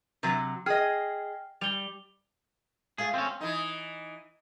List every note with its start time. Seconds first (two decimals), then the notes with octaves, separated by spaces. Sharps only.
0.23 C3 F#3
0.66 G#4 D#5 G5 F6 C7
1.61 G3 F7 G7
2.98 A3 F4 G#4 F5
3.14 C4 C#4
3.41 E3 D#4